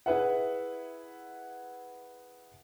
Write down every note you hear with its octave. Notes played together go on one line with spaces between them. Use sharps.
E4 G#4 B4 E5 F#5